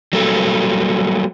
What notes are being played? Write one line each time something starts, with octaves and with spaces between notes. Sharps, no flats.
F#3 G3 A#3 A4